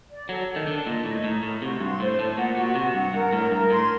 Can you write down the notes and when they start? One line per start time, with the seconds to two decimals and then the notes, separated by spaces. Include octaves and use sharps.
0.10 D5
0.29 F#3 A4
0.48 A4
0.56 D#3
0.67 D3 A5
0.86 A#2 D#5
1.05 A2 D#5
1.23 A2 D#4
1.43 A2 A#4
1.62 C3 F#4
1.80 G2 C6
2.00 A2 C5
2.18 A2 A5
2.37 A#2 F#5
2.57 A#2 F#4
2.75 C3 F#4
2.94 G2 F#5
3.13 G2 A#4
3.33 A2 A#4
3.51 G2 A#4
3.70 A2 C6